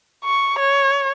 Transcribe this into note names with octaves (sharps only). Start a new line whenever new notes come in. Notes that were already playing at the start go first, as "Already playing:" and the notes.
C#6
C#5